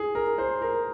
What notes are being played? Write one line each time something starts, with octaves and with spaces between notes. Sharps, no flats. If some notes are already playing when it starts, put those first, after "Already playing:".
Already playing: G#4
A#4
C5
A#4